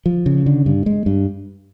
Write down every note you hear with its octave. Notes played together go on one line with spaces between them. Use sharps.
F3
C#3
D3
G2
G#3
G2